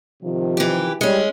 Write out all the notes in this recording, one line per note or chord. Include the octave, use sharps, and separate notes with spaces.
C3 D#3 F3
E3 G4
G3 G#3 C#4